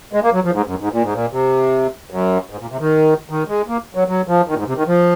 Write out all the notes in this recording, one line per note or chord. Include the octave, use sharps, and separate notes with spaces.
G#3
A#3
F#3
F3
G#2
F#2
G#2
A#2
G#2
A#2
C3
F#2
G#2
A#2
C3
D#3
D#3
G#3
A#3
F#3
F#3
F3
D#3
A#2
G#2
C3
D#3
F3